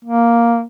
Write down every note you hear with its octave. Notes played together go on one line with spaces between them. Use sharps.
A#3